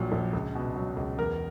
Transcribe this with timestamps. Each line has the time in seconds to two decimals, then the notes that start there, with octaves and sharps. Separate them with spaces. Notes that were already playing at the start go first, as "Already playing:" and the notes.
Already playing: A#1 A#2 F#3
0.12 A#1
0.33 C#2
0.55 B2
0.76 F#3
0.97 C#2
1.18 E2 A#4